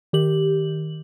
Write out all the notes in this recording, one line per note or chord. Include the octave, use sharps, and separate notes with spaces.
D#3 G4 F#7